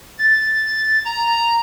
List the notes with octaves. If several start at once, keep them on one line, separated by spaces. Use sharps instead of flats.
A6
A#5